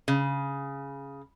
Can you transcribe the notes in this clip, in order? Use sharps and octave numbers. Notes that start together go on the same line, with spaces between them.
C#3